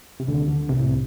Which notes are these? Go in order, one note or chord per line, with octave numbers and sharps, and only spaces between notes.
C3
D2 D3
D2 D3
C2 C3
A2